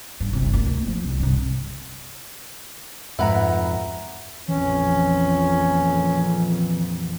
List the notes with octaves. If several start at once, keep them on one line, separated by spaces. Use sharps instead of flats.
G2
G1 C3
D2 A#3
F3
C2
G2 C3
F2 G#2 B2 B4 E5 F#5 A#5
A#1 F2 E3 C#4